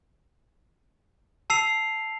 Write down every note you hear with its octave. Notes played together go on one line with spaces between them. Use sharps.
A5 E6 C7 F7